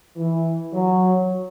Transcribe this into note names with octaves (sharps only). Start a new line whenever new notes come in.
E3
F#3